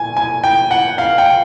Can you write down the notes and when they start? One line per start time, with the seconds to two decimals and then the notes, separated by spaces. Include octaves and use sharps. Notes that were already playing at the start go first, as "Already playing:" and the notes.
Already playing: A#2 G#5
0.17 G#5
0.44 G5
0.71 F#5
0.98 F5
1.18 G5